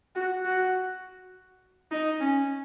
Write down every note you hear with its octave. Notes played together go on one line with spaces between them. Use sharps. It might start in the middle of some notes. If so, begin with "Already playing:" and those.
F#4
F#4
D#4
C#4